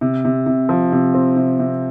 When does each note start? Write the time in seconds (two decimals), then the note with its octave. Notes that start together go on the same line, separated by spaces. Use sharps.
0.01 C3
0.25 C3
0.46 C3
0.69 F3
0.92 C3
1.14 C4
1.37 C3
1.59 C3